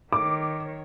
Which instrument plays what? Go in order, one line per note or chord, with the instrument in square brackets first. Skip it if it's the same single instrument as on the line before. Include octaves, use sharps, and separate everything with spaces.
[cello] D#3 C#5 [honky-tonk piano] D6